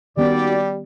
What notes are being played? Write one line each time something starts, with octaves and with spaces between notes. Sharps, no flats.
D#2 D#3 G3 B3 C#4 F#4 G4 D5